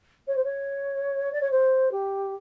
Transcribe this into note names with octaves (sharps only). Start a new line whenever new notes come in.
C#5
C5
C#5
D5
C#5
C5
G4